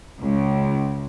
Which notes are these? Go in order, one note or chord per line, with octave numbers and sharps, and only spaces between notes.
C#2